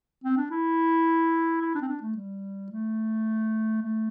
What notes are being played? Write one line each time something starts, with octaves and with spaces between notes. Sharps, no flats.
C4
D4
E4
E4
D4
C4
D4
A3
G3
A3
A3